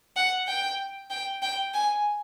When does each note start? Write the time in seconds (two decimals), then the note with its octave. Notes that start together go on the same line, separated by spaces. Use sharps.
0.16 F#5
0.48 G5
1.10 G5
1.42 G5
1.74 G#5